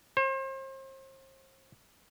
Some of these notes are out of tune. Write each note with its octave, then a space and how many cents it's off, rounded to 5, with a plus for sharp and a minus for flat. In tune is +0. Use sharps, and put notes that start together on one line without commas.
C5 +40